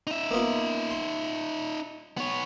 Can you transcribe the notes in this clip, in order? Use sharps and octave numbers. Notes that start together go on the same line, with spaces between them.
D#4 E5
A#3 B3 F4
C6
B3 C#5